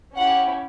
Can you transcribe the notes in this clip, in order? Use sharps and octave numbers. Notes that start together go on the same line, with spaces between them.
C#4 E4 G4 F#5